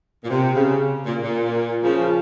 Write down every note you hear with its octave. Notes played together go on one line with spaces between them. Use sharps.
A#2
C3
C#3
A#2
A#2
C#3 F3